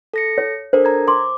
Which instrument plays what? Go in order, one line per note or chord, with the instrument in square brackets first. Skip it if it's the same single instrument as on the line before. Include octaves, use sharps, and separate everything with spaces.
[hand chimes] A4 A#6 C#7
[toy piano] C#5
[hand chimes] D4 A4 A#4 [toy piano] C5
[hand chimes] A#5 G#6
[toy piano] C6 [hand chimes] D6